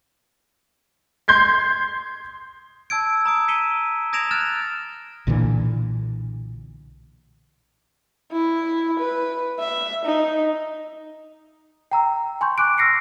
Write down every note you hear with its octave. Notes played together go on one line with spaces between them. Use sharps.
C6 G6 G#6 C7
A5 E6 G#6 D7
A#5 D#6 D7
B6 C#7 D#7 E7 G7
D#6 G#6 A#6 D7 E7 F7
F6 F#6 G#6 A6 E7
B1 A#2 D3 E3
E4
B4
E5
D#4
G5 A#5 E6
G#5 C6 C#6 G6
C#6 D6 F#6 D7
E6 F6 A#6 C7 C#7